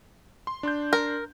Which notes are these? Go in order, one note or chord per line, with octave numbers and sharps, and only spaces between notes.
C6
D4 C6 G6
A#4